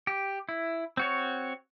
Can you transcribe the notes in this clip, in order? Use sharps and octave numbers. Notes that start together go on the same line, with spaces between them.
G4
E4
C4 F#4 C#5